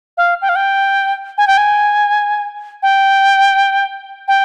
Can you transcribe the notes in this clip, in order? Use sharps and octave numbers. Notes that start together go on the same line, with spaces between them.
F5
G5
F5
G5
G#5
G5
G#5
G5
G5